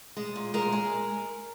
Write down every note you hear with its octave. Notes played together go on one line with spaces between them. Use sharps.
G#3
A#2
G#3 A#4
G#3